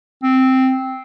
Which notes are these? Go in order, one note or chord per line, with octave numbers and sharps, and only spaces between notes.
C4